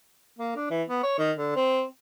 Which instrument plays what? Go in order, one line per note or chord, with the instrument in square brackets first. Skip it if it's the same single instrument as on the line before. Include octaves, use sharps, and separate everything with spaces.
[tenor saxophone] A#3
D4
E3
B3
C#5
D#3
D3
C4